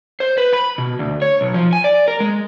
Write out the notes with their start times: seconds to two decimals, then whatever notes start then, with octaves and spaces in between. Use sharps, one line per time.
0.20 C5
0.38 B4
0.53 B5
0.78 B2
0.99 D2
1.22 C#5
1.41 B1
1.54 F3
1.73 G#5
1.84 D5
2.08 A#4
2.20 G#3